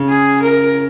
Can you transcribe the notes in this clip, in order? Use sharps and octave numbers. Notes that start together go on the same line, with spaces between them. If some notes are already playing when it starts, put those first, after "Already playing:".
Already playing: C#3
G#4
A#4